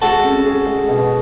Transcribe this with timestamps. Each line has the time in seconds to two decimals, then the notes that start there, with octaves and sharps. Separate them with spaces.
0.02 G#3 F#4 A4
0.24 C#4
0.46 G#4
0.67 G#3
0.89 B2